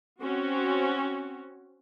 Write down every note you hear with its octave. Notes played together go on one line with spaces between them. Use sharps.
C4 C#4 F#4